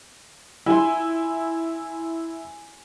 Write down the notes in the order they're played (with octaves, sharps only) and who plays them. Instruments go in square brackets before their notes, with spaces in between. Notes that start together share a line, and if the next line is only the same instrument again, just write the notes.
[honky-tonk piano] E4 [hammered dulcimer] G#5 C6